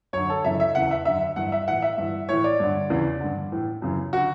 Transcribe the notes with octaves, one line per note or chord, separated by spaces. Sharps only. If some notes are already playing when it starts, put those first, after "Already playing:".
F#2 D3 C#5
A4
F#2 C#3 E3 E5
E5
E2 C#3 E3 F#5
E5
F#2 D3 E5
G2 E3 F#5
E5
A2 E3 F#5
E5
G2 E3
A2 E3 C#5
D5
G2 D3
E2 C#3 E3
G2 D3
A2 E3
F#2 C#3 E3
D3 F#4